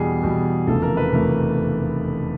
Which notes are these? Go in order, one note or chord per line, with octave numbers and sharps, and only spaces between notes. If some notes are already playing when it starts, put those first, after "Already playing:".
Already playing: E2 B2 G3 G#4
E2 B2 G3
F1 E2 C#3 F3 A3 A4
A#4
B4
F1 E2 C#3 F3 A3 A#4